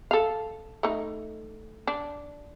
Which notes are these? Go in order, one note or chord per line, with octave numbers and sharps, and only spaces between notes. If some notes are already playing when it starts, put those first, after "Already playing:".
A4 F5
A3 D#4
D4